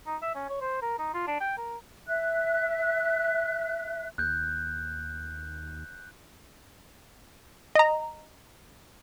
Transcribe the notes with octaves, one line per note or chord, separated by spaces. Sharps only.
D#4
E5
C#4
C#5
C5
A#4
D#4
F4
D4
G5
A#4
E5 F#6
D#2 F#6 G6
D#5 A#5